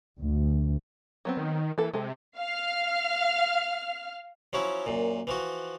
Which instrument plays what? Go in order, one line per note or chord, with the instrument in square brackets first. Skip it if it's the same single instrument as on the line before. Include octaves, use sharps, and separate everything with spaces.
[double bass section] D2
[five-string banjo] F#3 B3 C4
[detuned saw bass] D#3
[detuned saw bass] E3 [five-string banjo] A#3 A4
[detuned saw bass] C3 [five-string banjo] G#3 A4
[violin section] F5 F6
[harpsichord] F3 F#3 C#4 E4
F#2 A#2
E3 F3 F#4